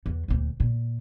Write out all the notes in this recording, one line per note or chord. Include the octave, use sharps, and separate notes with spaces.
E2
D#1 D2
A#2